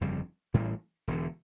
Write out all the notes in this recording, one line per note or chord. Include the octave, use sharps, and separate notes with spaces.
G1 F2 C#3 G3
A1 A2 E3 G3
E1 E2 D3